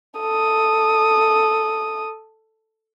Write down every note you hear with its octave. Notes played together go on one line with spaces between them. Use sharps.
A4 D#6